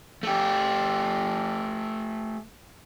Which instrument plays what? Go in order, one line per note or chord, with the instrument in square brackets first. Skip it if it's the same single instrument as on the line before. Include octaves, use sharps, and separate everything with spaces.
[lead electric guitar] A3 G4